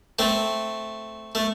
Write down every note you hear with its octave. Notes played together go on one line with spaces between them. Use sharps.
A3 C4
A3